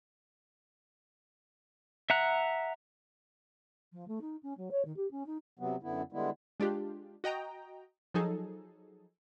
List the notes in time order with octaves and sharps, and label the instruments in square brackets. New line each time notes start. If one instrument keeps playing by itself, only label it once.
[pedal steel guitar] E5 F#5 A#5 F#6
[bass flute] F3
A3
D#4
C#4
F#3
C#5
D#3
G4
C#4
D#4
[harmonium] C3 F#3 B3
F#2 D3 B3 E4
D3 G3 G#3 B3 E4
[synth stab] G#3 D4 F4 G4
F#4 D#5 G5 A#5
F3 F#3 D#4 G#4 A4